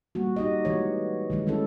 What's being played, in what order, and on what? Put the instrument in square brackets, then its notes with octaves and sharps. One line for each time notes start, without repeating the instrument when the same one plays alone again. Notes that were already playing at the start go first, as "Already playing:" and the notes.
[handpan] G3 A#3 F#4
D#4 G4 D#5
E3 G#3 A3 F#4 C#5
D#3 F#3 G#3
E3 A3 C#4 E4 A4